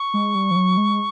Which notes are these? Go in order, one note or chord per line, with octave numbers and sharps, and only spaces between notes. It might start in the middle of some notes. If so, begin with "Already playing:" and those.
Already playing: C#6
G#3
G3
F3
F#3
G#3